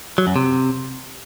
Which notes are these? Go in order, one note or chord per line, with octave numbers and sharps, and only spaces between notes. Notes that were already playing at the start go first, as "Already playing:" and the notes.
F#3
F#2
C3